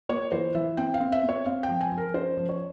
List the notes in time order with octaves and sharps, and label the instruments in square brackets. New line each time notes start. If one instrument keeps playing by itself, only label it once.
[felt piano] A#3 C#5
E3 C5
E3 E5
C4 G5
F5
C4
E5
C4
C#5
C4 F5
G5
F3
G#5
F3
A#4
C#4 C5
F3
C#5